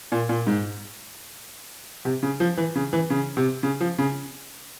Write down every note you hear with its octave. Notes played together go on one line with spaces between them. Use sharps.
A#2
A#2
G#2
C3
C#3
F3
E3
C#3
E3
C#3
C3
C#3
F3
C#3